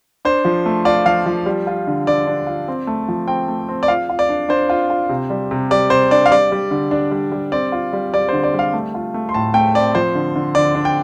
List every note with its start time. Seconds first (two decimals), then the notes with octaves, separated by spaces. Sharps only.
0.25 D4 C5
0.45 F3
0.66 A3
0.85 F4 D5
1.05 F3 F5
1.26 F3
1.46 G3
1.67 F4
1.87 D3
2.07 D3 D5
2.27 D4
2.47 F4
2.68 C4
2.87 A3
3.08 F3
3.28 C4 G5
3.48 A3
3.68 C4
3.83 D5
3.88 F4 F5
4.10 F4
4.19 D5
4.29 D4
4.49 D4 C5
4.70 F4
4.90 F4
5.09 C3
5.30 G3
5.51 C3
5.71 G3 D5
5.90 C3 C5
6.11 D4 D5
6.26 F5
6.31 G3 D5
6.52 G3
6.71 D3
6.91 D4
7.11 G3
7.32 G3
7.52 C4 D5
7.72 F4
7.93 G3
8.14 G3 D5
8.29 D3 C5
8.43 D5
8.54 G3 F5
8.73 A3
8.94 F4
9.14 A3
9.29 C6
9.34 A2 A5
9.54 A3 G5
9.74 C4 D5
9.95 F3 C5
10.15 D3
10.36 D3
10.55 D3 D5
10.75 D4
10.85 G5